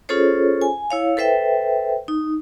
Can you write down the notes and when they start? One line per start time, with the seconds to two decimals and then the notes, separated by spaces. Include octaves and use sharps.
0.09 C#4 F4 G#4 A4 C5 C#5
0.62 G#5
0.91 E4 C#5 F5
1.17 A4 B4 C5 E5 G5
2.08 D#4